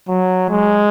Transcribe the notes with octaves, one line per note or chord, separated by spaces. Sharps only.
F#3
G#3